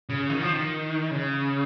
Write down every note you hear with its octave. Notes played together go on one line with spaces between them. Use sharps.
C#3
D#3
F3
D#3
C#3